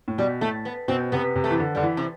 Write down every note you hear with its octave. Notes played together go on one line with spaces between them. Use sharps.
A2
B2 G3
A2 A3
B3
B2 C4
C3 B3
C3
A3
E3
D3
D3 G3
E3
C3